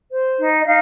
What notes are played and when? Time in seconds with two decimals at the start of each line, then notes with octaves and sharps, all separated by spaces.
0.12 C5
0.40 D#4
0.59 D#5
0.66 D#4 F5